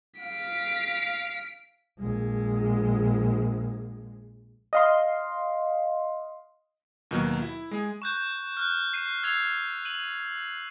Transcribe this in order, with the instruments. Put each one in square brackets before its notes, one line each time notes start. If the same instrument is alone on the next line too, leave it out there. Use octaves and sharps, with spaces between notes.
[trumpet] F5 [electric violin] B6 D7
[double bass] A#1 G#3
[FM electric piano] D#5 F5 C6
[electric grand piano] D#2 B2 D#3 F#3
E4
G#3 G#4
[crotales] C#6 F#6 G6
F6 F#6
C7 D#7
E6 G#6 C7 F7
D#7 F#7